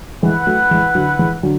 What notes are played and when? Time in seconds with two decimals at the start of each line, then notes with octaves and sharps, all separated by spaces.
0.22 E3 G#3 E4 B4 F#5
0.47 F#3 A3
0.71 E3 G#3
0.95 D3 F#3
1.19 E3 G#3
1.43 D3 F#3